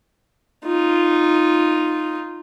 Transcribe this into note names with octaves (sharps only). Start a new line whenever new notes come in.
D#4 F4